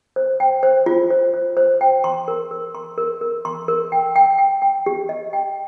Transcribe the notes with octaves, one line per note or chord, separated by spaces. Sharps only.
C5
G5
C5
F4
C5
C5
C5
G5
C6
A#4
A#4
C6
A#4
A#4
C6
A#4
G5
G5
G5
G5
G4
D#5
G5